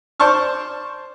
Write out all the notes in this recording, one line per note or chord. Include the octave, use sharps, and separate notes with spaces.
C5 D5 A5 C#6 F6